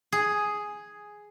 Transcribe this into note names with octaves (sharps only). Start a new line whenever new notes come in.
G#4